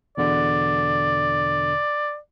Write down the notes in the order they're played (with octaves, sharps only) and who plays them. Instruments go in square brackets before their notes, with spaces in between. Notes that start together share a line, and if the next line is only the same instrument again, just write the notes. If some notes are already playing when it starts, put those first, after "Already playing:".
[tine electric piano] E2 B2 D3 [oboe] D5